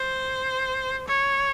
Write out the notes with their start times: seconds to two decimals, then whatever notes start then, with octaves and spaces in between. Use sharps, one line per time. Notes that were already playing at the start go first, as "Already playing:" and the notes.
Already playing: C5
1.07 C#5